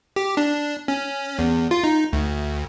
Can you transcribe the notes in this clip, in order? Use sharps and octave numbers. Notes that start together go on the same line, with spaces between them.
G4
D4
C#4
E2
F4
D#4
D2